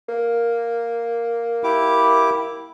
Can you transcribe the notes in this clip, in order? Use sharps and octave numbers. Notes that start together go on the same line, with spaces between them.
A#3
E4 G4 D6